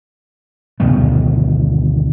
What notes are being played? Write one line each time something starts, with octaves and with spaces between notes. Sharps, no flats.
D2 B2 D#3 A3